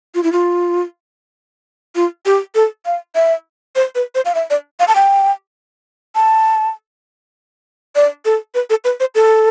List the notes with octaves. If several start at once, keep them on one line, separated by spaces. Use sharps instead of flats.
F4
E4
F4
F4
G4
A4
F5
E5
C5
B4
C5
F5
E5
D5
F5
A5
G5
A5
D5
A4
B4
A4
B4
C5
A4